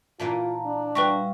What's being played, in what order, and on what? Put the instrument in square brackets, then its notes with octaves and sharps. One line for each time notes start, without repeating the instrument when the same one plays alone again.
[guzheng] A#2 E3 A#3 [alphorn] F4 [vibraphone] A5 A#5
[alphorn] D4
[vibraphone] G3 [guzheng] F4 F#4 E5 [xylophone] B4 G5 C#6